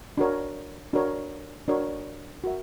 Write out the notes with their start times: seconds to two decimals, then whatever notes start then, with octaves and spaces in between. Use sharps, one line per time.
0.17 D4 F#4 A#4 C#5
0.93 D4 F#4 A#4 C#5
1.68 D4 F#4 A#4 C#5
2.44 F#4 A#4 E5